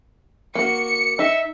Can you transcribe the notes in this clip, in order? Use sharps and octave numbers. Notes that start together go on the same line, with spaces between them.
A#3 F#4 C#7
D#4 E5